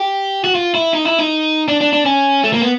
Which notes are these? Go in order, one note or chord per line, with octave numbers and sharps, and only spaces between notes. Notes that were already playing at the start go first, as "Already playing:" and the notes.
Already playing: G4
F#4
F4
E4
D#4
E4
D#4
D4
D4
D4
C#4
A3
A#3
B3